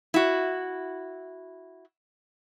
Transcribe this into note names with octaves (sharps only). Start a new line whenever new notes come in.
E4 F#4